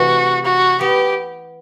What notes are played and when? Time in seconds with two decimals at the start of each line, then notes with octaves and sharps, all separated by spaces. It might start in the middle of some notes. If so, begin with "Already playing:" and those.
Already playing: C3 E3 A3 F#4
0.45 F#4
0.81 B3 G4